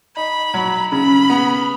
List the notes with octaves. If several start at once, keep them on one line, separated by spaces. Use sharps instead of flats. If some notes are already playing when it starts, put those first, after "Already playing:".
D#4 B5
F#3
C#3 B5
B3